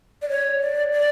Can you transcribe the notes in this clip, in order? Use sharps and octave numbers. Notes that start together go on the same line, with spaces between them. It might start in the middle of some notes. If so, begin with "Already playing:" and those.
D5
C#5
D5
D5